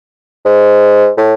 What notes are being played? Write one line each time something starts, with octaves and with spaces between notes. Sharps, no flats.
G#2
A2